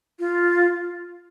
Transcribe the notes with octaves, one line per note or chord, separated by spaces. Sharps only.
F4